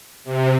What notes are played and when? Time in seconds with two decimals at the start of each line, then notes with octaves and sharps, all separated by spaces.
0.24 C3